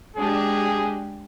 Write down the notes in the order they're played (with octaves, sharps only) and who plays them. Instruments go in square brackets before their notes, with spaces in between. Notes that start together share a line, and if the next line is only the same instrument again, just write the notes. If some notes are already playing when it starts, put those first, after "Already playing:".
[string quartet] G#3 D4 G4 [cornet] G#4